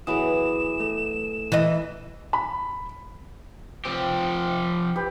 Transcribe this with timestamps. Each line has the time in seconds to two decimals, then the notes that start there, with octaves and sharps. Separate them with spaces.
0.07 E3 F#3 B3 G#4 B5 D#6 E7
0.80 A3 A4
1.52 E3 E4 D#5
2.33 B5
3.85 F3 C4 G4
4.96 G4 B4